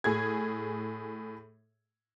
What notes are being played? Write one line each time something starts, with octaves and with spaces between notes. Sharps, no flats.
A2 G#4 G#6